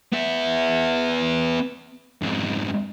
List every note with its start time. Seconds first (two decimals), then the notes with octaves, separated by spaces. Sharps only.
0.13 B3 E5
2.22 F2 G#2